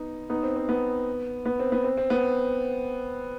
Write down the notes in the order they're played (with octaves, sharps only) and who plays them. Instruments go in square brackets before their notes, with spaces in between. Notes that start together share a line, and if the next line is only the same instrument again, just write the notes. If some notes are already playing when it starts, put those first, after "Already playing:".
Already playing: [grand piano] B3 D#4
B3 D#4
C4
C4
B3
B3
C4
B3
C4
C4
B3